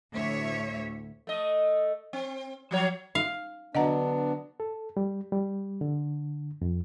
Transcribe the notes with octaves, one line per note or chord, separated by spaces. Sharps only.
D2 A2 C#5 E5
A3 D#5
C4
F3 F#3 C#5
D#4 F5
D3 F#3 B3 D4 D#5 F#5 A#5
A4
G3
G3
D3
F2